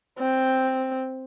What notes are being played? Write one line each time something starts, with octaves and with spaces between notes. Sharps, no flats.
C4